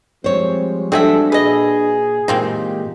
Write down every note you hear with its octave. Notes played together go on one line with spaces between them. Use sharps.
F3 G3 G#3 C4 C5 C#5
C4 D4 F#4 G#4 A4 E5
A#2 G#4 B4 D#5
A#2 E3 G#3 A#3 C4 D#4 F4 G4